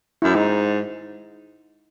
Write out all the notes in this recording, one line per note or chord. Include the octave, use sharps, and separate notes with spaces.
F#2 E4
G#2 D#4